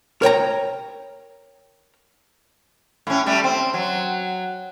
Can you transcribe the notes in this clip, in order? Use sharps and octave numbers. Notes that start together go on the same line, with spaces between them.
A#4 C#5 G5 A#5
A2 C#4
A2 G3 A3
C4
F#3